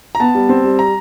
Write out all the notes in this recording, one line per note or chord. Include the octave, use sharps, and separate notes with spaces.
A#5
B3 A5
G3
C4
G3
A#5